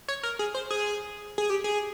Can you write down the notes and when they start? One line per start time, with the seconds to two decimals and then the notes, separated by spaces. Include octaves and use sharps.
0.08 C#5
0.23 A#4
0.39 G#4
0.54 C5
0.70 G#4
1.38 G#4
1.50 G4
1.64 G#4